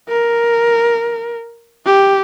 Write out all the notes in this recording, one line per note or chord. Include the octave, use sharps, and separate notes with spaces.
A#4
G4